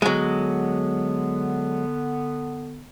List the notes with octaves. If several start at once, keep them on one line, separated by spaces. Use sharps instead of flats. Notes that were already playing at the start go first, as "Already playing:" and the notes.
D3 F#3 G#3 B3